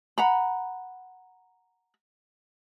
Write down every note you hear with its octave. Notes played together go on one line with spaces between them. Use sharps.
F#5 A#5 B5